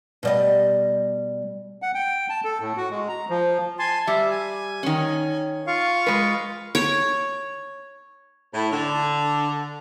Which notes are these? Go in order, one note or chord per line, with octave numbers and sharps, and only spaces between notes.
B2 G3 D#5
F#5
G5
A5
A4
A2
F#4
G#3
A#5
F3
G#5 A5 C6
G3 E5
G#5
D#3 C#4
F4 F5 C#6
G#3 B4
C#5
A2
D3